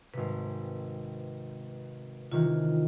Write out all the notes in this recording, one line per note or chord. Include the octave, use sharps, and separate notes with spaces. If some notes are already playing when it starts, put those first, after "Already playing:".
G#1 C3 B4
C3 D#3 E3 F4